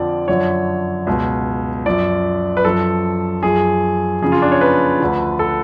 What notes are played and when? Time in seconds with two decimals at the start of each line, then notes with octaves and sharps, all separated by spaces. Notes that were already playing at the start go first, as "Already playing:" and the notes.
Already playing: F2 D3 F3 D5
0.28 F#2 D3 F3 C#5
1.07 C#2 B2
1.86 F#2 F3 D5
2.57 B4
2.65 F#2 F3 A4
3.43 F#2 F3 G#4
4.22 F2 C#3 F3 G#4
4.32 F4
4.42 D4
4.52 C#5
4.61 B4
5.00 D2 D3 F3
5.39 A4